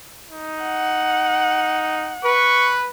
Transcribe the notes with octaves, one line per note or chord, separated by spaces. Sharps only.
D#4
F#5
B4 C#6